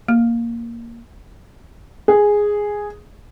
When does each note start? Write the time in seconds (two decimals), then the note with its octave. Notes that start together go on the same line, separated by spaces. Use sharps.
0.08 A#3
2.08 G#4